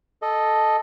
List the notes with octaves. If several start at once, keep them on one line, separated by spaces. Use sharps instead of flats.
A4 D#5